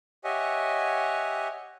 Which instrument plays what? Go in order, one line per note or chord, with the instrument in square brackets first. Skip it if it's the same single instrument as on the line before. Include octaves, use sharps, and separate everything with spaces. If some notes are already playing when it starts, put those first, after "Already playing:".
[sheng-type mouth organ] G4 C#5 D#5 E5 F#5 G#5